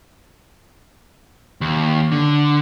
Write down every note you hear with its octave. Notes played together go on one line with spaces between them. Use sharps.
D#2
D3